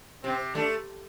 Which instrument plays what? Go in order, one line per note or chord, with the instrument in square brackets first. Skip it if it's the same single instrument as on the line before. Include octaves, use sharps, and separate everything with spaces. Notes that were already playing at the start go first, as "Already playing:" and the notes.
[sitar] C3 [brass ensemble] C4
[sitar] A3 [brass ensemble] D4